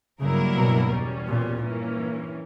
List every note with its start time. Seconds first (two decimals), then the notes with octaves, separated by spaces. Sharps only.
0.20 G2 C#3 F#3 A#3 E4 A#4
0.56 B2
0.92 E2 B2 G3 C#4
1.28 A#2
1.63 G2 E3 A#3 C#4